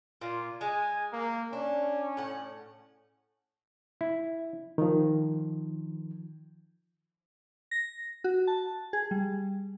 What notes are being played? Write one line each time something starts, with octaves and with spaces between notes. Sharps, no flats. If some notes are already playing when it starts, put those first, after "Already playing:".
A#2 F4
G#3 G#5
A#3
C#4 D4
A2 F#5
E4
D#3 F3
A#6
F#4
A5
G#4
G3